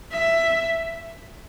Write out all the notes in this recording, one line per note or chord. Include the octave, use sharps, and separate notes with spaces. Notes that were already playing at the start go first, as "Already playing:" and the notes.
E5